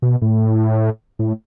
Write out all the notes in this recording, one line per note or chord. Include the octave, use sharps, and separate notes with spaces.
B2
A2
A2